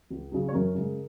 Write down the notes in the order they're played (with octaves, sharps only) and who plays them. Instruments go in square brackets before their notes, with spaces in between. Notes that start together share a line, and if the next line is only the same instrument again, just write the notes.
[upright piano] C#2
C#3 F#3
C#5
F#2 A#4
C#3 G#3